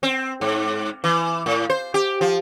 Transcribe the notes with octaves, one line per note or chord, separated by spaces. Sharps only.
C4
G#2
E3
A2
C5
G4
F3